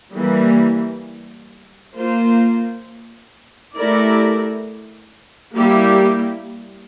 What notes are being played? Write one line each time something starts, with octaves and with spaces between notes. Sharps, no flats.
E3 G3 A#3
A#3 F4 C5
A3 E4 G4 A#4 D5
G3 A#3 E4 G4